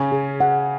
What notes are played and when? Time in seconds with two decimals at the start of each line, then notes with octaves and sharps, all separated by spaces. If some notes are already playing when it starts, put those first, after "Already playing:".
Already playing: C#3 C#4
0.12 G#4
0.40 F#5